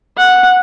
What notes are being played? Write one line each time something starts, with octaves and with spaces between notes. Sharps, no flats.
F#5